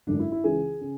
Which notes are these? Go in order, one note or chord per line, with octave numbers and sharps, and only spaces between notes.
G#1 F#2 D3 D4
E4
E4
C#2 C#3 E3 G#4
C#3